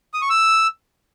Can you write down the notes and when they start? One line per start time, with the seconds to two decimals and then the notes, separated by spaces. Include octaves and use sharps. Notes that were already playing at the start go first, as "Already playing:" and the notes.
0.14 D#6
0.22 C#6
0.30 E6